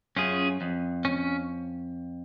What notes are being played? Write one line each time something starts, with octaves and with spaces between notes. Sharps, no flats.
F#2 C#4 F4 G#4
F2
C#4